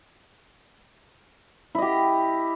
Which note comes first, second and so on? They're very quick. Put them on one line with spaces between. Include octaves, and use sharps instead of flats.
E4 D#5 G4